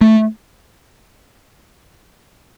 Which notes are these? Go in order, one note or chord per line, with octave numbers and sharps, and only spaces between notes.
A3